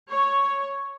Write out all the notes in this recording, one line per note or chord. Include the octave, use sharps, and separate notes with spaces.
C#5